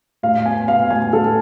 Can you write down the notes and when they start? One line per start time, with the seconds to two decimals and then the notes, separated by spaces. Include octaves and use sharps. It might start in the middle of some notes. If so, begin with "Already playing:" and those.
0.23 A2 F5
0.45 B3 G#5
0.68 B3 F5
0.90 A2 G#5
1.13 A2 A4